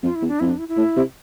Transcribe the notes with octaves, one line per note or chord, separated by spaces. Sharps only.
F2 F4
E4
E2
D4
F2 E4
D4
E4
E4
A2
C3